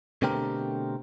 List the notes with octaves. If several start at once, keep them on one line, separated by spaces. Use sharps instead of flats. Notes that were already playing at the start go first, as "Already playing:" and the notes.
B2 D3 A3 C4 G4 A#4